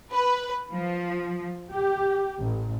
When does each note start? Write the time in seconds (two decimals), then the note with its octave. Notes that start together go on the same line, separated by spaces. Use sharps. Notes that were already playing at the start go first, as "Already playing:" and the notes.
0.12 B4
0.72 F3
1.72 G4
2.39 A1